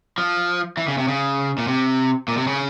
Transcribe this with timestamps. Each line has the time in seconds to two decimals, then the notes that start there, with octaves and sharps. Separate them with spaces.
0.18 F3
0.77 E3
0.88 C#3
0.98 C3
1.08 C#3
1.58 A#2
1.68 C3
2.28 A#2
2.37 C3
2.47 C#3